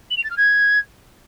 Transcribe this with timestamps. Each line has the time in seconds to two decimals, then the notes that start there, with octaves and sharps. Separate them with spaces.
0.10 F#7
0.17 F7
0.23 A6
0.30 F6
0.37 G#6